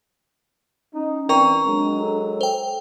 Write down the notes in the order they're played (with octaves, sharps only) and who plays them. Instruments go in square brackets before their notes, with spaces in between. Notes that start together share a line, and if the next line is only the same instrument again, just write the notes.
[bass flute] C#4 [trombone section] D#4
[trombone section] E3 C4 [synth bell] A#4 A#5 [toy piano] D5 G5 C#6
[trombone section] F#3 G#3 [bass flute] D4
[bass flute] A4
[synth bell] C5 G5